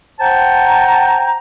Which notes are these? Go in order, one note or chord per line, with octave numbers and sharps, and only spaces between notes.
C5 F#5 G5 A5 A#5